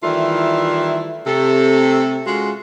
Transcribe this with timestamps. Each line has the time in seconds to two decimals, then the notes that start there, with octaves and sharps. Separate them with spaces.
0.03 D#3 E3 G3 A3 E4 F4
1.27 C3 A3 A4
2.26 G#3 C#4 F4 F#4